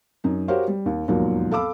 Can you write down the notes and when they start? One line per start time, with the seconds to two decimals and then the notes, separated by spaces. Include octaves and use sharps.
0.24 F#2 D#4
0.48 F#4 G4 A#4 C5 C#5 F5
0.68 G3
0.86 D#2
1.08 E1 D#2 G#2 F3 F#3 A#3
1.51 A4 F5 B5 D6 E6